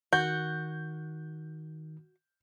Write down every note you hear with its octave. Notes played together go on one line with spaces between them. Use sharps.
D#3 F#4 G6